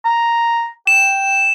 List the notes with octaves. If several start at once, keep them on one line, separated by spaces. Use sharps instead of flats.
A#5
G5 E7